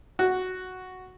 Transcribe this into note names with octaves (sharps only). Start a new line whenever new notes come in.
F#4